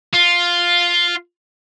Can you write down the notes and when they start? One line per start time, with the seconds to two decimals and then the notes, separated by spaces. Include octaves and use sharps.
0.13 F4